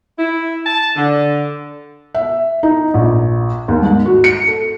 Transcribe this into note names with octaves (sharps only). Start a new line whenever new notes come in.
E4
A5
D3
E5
D#4
A#1
D#2
G#2
F#4
C#7
A4